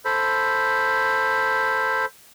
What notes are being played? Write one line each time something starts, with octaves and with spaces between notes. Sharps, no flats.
A4 C5 B5